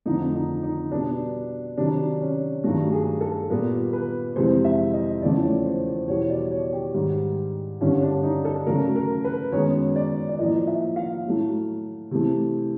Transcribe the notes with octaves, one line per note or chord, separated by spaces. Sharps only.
F2 D3 F3 A3 D#4
D#4
D#4
B2 G3 B3 D4
C3 D#3 F#3 D4
C#4
G2 D#3 F#3 A3 F#4
G#4
A4
A#2 G3 B3 A#4
B4
F2 C3 E3 G#3 C5
E5
D#5
E2 C#3 F3 A3 D5
C#5
C5
C5
E2 B2 G3 C#5
D5
C#5
G4
G#2 D#3 G3
G2 D3 G3 C#4
D4
D#4
A4
C#3 F#3 A3 A#4
A#4
B4
F#2 D#3 G#3 B3 C#5
D5
D5
A2 F3 A#3 D#5
E5
F5
A2 F#3 A3
C3 E3 A3